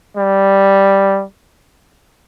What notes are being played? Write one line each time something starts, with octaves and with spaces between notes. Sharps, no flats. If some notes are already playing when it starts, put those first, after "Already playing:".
G3